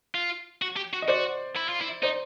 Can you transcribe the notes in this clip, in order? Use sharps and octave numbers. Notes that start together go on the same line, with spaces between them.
F4
F#4
G4
F#4
D#5
F#4 C5 D5
E4
F4
E4
D#4 C5 D5